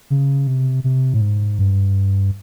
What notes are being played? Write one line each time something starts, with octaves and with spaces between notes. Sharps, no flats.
C#3
C3
C3
A2
G#2
G2